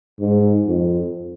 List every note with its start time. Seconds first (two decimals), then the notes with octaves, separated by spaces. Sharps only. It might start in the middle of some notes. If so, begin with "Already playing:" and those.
0.19 G#2
0.67 F2